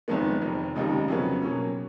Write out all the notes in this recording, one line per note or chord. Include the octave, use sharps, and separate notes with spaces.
F#1 F2 D#3 G#3 B3
F1 F2 D#3
F1 D#2 C#3 F3 G#3
F2 C#3 F#3 B3
B2 F#3 A#3 C#4